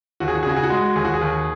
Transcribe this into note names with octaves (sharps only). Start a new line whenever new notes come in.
D#2 F#4
G#4
F#4
G#4
C#3 F#4
G#4
F#4
G#3
D#2 G#4
F#4
G#4
D#2